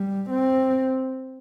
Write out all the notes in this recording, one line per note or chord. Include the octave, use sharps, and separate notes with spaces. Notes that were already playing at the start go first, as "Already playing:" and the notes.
Already playing: G3
C4